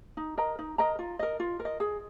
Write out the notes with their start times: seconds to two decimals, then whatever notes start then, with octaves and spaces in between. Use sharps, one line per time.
0.17 D#4
0.37 A#4 D#5 A#5
0.59 D#4
0.78 A#4 D#5 A#5
0.99 F4
1.19 A#4 D#5
1.40 F4
1.60 A#4
1.65 D#5
1.80 G#4